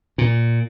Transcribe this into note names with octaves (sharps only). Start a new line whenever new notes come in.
A#2